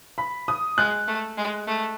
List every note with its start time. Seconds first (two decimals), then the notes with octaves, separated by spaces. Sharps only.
0.18 B5
0.48 D#6
0.78 G#3 F#6
1.08 A3
1.38 G#3
1.67 A3